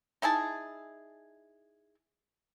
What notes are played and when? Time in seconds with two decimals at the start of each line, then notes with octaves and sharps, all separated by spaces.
0.22 D#4 E4 G#4 A5